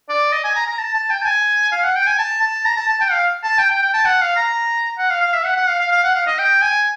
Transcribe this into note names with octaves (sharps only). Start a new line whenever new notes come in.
D5
D#5
G#5
A#5
A#5
A5
A5
G5
A5
G#5
F5
F#5
G5
G#5
A5
A5
A#5
A5
A5
G5
F5
A5
G5
G5
G5
A5
F#5
F5
A#5
F#5
F5
F5
E5
F#5
F#5
F5
F5
F5
F#5
F5
D#5
G5
G#5